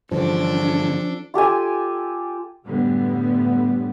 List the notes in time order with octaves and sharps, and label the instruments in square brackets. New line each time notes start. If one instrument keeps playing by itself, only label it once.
[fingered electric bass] G2 D3 E3 [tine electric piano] F3 [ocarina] C#4 [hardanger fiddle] D4 A4
[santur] F4 G4 A4 G#5
[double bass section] F#2 A2 D3 G3 B3